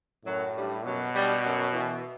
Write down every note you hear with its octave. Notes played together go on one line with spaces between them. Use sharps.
F#2 A2 F#3
G2 G3
F#2 B2 F#3
G2 G3
F#2 F#3
E3